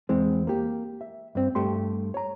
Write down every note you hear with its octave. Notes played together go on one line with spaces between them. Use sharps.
E2 E3 G#3 C4
A#3 G4
E5
G2 C4
G2 A3 G4 C6
C#5 A#5